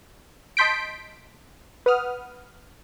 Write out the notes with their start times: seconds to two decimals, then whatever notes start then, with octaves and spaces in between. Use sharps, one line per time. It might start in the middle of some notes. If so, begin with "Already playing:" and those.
0.57 D#5 A5 C6 G6 B6 D7
1.86 B4 F#5 D#6 F6